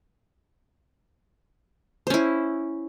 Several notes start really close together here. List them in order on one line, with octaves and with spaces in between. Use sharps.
C5 C#4 E4